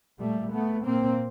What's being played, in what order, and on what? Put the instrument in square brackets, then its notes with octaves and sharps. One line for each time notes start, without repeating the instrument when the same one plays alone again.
[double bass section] A#2 G3 A3
A3 B3
A#2 A#3 C4